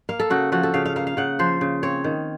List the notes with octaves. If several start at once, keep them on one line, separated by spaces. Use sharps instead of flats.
A#3 F5
A4
C#3 F#4
F3 F#4
A4
C#3 F5
F5
A#3 F5
F5
C#3 F#5
F3 C5
C#3
C4 C#5
D#3